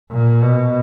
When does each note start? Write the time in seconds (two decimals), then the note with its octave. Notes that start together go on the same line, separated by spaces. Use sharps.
0.11 A#2
0.43 B2